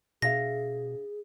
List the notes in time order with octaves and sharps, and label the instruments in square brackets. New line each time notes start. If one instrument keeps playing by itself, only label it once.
[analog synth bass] B2 [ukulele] D4 E5 F5 [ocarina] G#4 [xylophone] A#6